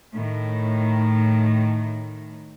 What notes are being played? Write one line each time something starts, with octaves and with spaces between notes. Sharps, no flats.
A2 D#3